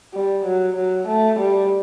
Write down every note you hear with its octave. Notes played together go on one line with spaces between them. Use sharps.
G3
F#3
F#3
A3
G3